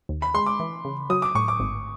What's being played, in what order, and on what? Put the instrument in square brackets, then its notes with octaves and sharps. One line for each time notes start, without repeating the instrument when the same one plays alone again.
[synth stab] D#2
[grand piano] B5
[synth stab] G#3 [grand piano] C6
[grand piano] D6
[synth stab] E3
C#3
[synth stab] F#3 [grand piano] D#6
[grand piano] D6
[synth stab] A2 [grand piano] C#6
[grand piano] D6
[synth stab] G#1